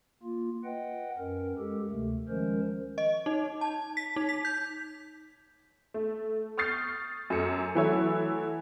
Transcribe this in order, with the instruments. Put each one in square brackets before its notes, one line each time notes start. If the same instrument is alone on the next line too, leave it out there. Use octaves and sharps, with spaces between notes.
[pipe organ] A#3 F4
B4 D#5 F#5 G5
F#2 C#4 A#4
G#3 G4 A4
D2 C3 A3
D#3 F3 G#3 C#4 A#4 C5
[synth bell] D#5
D#4
A5
B6
D#4
B6
G6
[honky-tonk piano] A3
C#6 D#6 F6 G6 A6 C7
F#2 A4 C#7
E3 F#3 A3 E4 A4 C#5